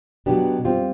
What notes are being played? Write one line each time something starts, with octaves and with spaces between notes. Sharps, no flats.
B2 F#3 B3 D4 G4
G3 C4 F4